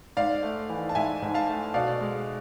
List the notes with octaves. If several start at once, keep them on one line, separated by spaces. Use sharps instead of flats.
G#2 D5 F5
A3
E3
A5
G#2 E5 G#5
G#2
F5 A5
A3
B2 D5 F5
G#3